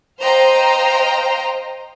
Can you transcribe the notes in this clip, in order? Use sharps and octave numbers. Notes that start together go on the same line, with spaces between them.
C5 D#5 F5 G5 A#5 C6